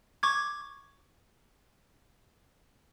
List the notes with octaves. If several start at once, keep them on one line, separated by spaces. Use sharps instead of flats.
C#6 D6 G#6